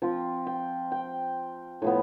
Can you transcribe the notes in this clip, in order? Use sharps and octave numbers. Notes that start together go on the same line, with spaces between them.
F3 C4 F4
G5
G5
A2 F3 B3